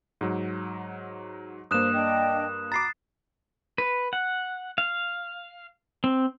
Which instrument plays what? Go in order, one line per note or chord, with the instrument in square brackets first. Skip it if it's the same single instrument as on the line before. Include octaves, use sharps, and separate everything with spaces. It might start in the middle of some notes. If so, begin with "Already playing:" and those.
[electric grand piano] G#2 F#3
[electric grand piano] G2 A#3 [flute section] C5 [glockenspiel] D#6 F#6 E7
[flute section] D4 D#5 G5
[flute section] F#4 B5 [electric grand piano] A#5 D6 [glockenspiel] A6 C7
[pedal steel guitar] B4
F#5
F5
C4